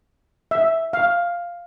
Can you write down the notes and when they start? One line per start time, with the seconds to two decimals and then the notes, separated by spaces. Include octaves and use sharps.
0.51 E5
0.93 F5